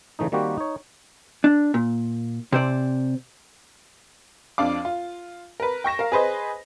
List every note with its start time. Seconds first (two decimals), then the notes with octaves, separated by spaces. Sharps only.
0.19 C#3 E3 A3 D#4
0.32 D#3 G3 A#3 C4 F#4 G4
0.58 D#4 C#5
1.44 D4
1.74 A#2
2.52 C3 C5 D5
4.58 F2 D4 F5 D6
4.85 F4
5.60 A#4 B4
5.84 G5 C#6 A#6 E7
5.99 A#4 F5
6.12 G#4 B4 C5 D#5